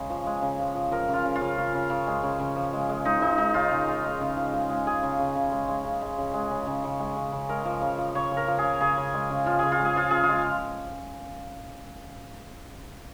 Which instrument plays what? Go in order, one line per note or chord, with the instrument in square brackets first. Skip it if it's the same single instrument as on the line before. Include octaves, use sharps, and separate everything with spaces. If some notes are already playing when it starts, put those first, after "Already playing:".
Already playing: [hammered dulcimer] C#3 G#3
F3
G#3
C#3
F3
F3
F3 A#4
C#3 F4
C#3
F4
C#3
C#3
C#3
C#3
G#3
C#3
C#3
F3
G#3
G#3
G#3 D#4
F3 D#4
G#3 D#4
C#3 F4
C#3
G#3
G#3
C#3
F3
G#3
G#3
C#3 G#4
C#3
C#3
C#3
G#3
G#3
C#3
G#3
C#3
G#3
C#3
C#3
C#3
G#3
C#3
C#3
G#3 A#4
F3
C#3
F3
C#3 C#5
C#3
A#4
F3
G#4
C#3
C#3 G#4
C#3
G#3
C#3
F3 F4
C#3 G#4
F4
G#3
G#4
F3 F4
C#3 G#4
F4
G#3